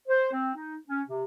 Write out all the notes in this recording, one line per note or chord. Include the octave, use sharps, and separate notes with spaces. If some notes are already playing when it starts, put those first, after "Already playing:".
C5
C4
D#4
C#4
C3